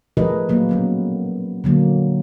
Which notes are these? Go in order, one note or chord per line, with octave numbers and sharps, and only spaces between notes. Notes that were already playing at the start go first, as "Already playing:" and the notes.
F3 A3 G#4 A#4 B4 D#5
F#3 A#3
F#3 B3 C#4
D3 F#3 A#3